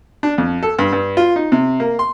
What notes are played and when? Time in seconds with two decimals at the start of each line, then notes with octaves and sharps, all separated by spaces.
0.23 D4
0.38 F2
0.63 A4
0.79 G2
0.93 G2
1.17 F4
1.36 D#4
1.52 C3
1.80 A#3
1.99 C6